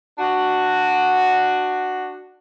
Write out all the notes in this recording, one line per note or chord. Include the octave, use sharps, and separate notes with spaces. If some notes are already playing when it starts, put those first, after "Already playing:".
D4 F#4